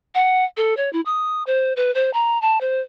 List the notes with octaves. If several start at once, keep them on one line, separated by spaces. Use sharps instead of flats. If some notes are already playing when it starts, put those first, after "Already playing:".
F#5
A4
C#5
E4
D#6
C5
B4
C5
A#5
A5
C5